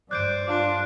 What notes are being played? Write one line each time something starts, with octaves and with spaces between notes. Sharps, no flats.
G2 C5 D5 F#6 G6 D7
D4 F4